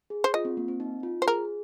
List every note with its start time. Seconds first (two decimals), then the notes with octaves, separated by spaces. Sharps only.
0.10 G#4
0.24 C5
0.34 F4 D#5
0.45 C4
0.57 A#3
0.68 C4
0.80 D#4
1.03 F4
1.22 C5
1.27 G#4 A#4